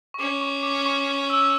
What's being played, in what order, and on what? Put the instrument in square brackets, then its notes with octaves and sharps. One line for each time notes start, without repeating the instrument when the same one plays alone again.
[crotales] C#6
[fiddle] C#4 [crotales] D6
[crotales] C#6
D6
C#6
E6